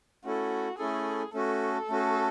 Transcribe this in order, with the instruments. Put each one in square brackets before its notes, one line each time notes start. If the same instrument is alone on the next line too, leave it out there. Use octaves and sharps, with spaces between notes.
[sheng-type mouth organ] A3 C#4 E4 A4 [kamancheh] F#4
[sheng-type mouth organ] A3 C#4 E4 A4 [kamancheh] G#4
[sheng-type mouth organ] A3 C#4 F#4 [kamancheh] A4
[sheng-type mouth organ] A3 C#4 F#4